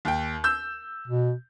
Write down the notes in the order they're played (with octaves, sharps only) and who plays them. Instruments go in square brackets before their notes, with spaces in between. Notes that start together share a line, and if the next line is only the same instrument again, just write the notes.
[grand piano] D#2 G5
E6 G6
[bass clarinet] B2